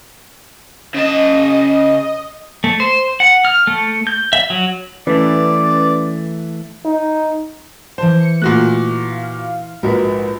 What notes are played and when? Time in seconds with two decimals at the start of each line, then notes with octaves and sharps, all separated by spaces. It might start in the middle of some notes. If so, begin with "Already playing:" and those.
0.95 C#3 D#5 A5
2.64 A3
2.80 C5
3.20 F#5
3.45 F6
3.67 A3
4.07 G6
4.33 E5
4.50 F#3
5.07 E3 A3 C#4 B4 D5
6.85 D#4
7.98 E3 C5 A5
8.21 C#7
8.42 A#2 A3 F#4 F#6
9.10 F5
9.83 A#1 G#2 F#4 A#4 B4